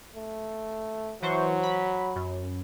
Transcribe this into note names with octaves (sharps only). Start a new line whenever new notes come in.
A3
E3 F#3 C5 C#6
B5
F#2